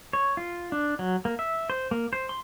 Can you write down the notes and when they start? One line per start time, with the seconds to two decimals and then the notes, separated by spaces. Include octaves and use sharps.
0.13 C#5
0.37 F4
0.72 D4
0.99 F#3
1.25 A#3
1.39 E5
1.70 C5
1.91 A#3
2.13 C5
2.29 C6